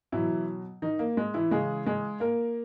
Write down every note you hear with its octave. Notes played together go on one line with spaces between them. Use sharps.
B2 E3 F#3 E4
D#3 D#4
A#3
G#3
E3 E4
C#3 E3 G#3 G#4
G#3 G#4
A#3 A#4